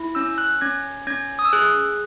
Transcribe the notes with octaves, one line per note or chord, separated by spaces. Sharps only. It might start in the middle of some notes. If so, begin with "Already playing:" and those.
Already playing: E4
C#4 E6
F#6
C#4 G#6
C#4 G#6
D#6
E6
G#4 F#6